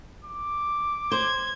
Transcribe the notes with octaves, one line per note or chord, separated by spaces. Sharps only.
D6
C5 G#6